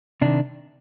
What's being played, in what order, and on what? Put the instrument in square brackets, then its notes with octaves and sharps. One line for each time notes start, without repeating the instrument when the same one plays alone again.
[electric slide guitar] C3 D#3 D4